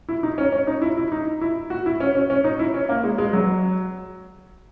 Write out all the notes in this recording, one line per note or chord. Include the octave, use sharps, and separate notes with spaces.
E4
D#4
C#4
C#4
D#4
E4
E4
D#4
E4
F#4
E4
C#4
C#4
C#4
D#4
E4
C#4
A#3
G#3
G#3
F#3